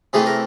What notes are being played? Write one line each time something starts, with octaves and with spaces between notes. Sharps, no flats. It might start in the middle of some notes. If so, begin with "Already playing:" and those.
C3 E3 A3 G#4
A#4